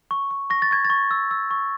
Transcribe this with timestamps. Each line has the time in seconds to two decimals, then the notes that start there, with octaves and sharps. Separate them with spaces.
0.11 C#6
0.31 C#6
0.50 C#6 A#6
0.62 A6
0.71 C#6 G#6
0.85 A6
0.90 C#6
1.11 E6
1.31 E6
1.51 C#6